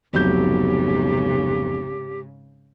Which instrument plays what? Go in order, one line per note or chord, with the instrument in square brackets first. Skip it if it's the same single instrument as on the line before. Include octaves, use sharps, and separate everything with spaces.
[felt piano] F1 F#3 G6 [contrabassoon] B1 [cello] G#2 C#3 [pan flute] G4